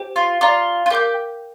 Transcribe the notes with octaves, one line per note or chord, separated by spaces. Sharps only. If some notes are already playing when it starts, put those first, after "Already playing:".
Already playing: G4 C5 G5
F4
F4 D5 F5 A#5 D6
F4
G4 A#4 F5 D6 G6